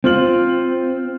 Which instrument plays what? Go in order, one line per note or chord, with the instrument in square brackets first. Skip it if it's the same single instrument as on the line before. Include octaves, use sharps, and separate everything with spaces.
[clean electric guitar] C4 [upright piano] F4 F6 F#7